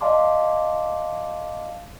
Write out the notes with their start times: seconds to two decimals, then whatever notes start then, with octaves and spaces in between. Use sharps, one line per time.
0.01 D5 D#5 F5 A5 C6 D6